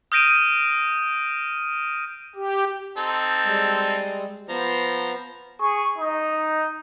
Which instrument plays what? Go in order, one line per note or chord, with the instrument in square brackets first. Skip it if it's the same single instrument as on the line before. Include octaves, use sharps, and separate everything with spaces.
[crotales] D#6 F6 G6 A#6 D7 D#7
[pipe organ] G4
[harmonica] C4 D#4 A4
[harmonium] G3 G#3
[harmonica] F3 A#5 [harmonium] B3 C5
[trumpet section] G#4 C#6
D#4